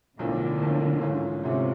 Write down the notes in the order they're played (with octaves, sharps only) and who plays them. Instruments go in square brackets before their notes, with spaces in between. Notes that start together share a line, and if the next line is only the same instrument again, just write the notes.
[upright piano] B1 A2 F3 A#3 [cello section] D3
[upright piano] B1 A2 F3 A#3
G#2 E3 A3 C#4 F4
[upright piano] G#2 E3 A3 C#4 F4 [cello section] C3